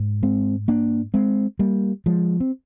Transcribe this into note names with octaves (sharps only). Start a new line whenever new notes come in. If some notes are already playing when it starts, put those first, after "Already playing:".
Already playing: G#2
G#3 C4
A#3 D4
G#3 C4
G3 A#3
F3 G#3
C4